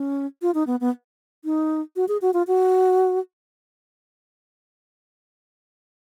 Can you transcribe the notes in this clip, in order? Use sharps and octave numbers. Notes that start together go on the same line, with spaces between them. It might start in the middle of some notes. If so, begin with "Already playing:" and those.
Already playing: C#4
F4
D#4
B3
B3
D#4
F#4
G#4
F#4
F4
F#4